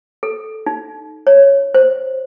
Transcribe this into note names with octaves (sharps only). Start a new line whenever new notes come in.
A4
D#4
C#5
C5